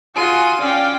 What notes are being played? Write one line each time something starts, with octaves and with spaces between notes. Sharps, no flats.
F4 F#4 G#4 D#7
C#4 D5 F5 G5